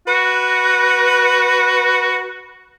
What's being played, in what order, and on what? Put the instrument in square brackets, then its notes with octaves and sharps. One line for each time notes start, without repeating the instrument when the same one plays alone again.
[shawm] F#4 [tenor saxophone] B4